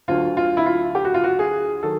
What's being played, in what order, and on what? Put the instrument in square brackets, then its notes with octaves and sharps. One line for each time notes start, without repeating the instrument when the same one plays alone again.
[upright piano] D2 D3 F#3 F4
F4
E4
F4
G4
F#4
F4
F#4
G#4
D#3 F#3 A4